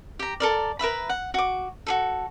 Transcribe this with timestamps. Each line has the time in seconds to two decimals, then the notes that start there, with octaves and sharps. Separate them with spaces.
0.19 G4 A#5
0.40 A4 A#4 D5
0.79 A#4 B4 E5 B5
1.09 F#5
1.34 F#4 D6
1.87 F#4 G#4 A4